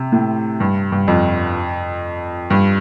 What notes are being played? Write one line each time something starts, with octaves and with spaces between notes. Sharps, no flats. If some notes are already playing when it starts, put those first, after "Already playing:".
Already playing: C3
A2
G2
G2
F2
G2